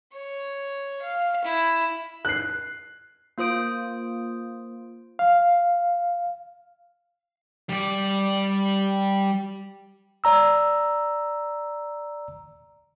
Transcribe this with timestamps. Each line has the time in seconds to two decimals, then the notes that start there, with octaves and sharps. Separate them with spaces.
0.14 C#5
1.02 F5
1.44 E4
2.25 F#6 C7
3.38 A#3 F4 C5 D#6 D7
5.19 F5
7.69 G3 D5
10.24 D5 A#5 E6